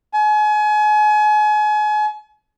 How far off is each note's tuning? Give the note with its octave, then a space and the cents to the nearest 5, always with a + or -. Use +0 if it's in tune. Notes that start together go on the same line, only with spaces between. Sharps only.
G#5 +35